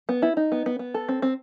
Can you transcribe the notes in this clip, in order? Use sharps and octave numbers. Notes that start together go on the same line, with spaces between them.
B3
E4
D#4
B3
B3
B3
A4
C4
C4